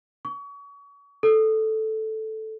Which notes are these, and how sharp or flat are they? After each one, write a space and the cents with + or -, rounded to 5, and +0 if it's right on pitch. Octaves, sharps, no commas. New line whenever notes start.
C#6 +35
A4 -5